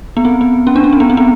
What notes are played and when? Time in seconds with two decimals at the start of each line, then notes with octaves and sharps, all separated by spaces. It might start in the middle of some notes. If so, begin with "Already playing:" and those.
0.17 B3
0.25 C4
0.41 B3
0.67 C#4
0.76 D4
0.84 C#4
0.93 C4
1.00 B3
1.10 C4
1.17 B3